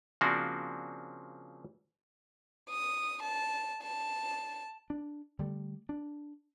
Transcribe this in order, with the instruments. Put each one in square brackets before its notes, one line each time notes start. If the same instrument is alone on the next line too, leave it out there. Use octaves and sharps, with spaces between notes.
[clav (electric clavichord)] C#3 F3 A#3 C4 D4 F#4
[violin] D#6
A5
A5
[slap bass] D4
D3 G3 A3
D4